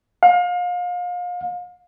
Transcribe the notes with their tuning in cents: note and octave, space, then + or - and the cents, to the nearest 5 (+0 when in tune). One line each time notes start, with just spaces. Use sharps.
F5 +35